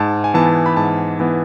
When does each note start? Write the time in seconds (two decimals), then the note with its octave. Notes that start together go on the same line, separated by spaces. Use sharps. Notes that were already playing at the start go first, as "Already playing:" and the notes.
Already playing: G#2 A5
0.24 G#5
0.34 E3 B3 A5
0.66 B5
0.77 G#2 A5
1.20 E3 B3